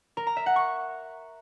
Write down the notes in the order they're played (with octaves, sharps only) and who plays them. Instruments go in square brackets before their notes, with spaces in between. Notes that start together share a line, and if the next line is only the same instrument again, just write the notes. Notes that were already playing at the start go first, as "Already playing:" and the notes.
[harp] A#4
A#5
E5
F#5
C#6